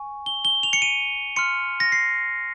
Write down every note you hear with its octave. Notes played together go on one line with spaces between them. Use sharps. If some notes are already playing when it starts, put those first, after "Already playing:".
Already playing: G#5 C#6
G7
G7
F7
C#7
D#7
C6 F6 C#7
A#6
C7